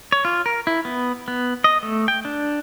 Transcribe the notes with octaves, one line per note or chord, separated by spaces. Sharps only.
C#5
F4
A#4
E4
B3
B3
D#5
A3
G5
D4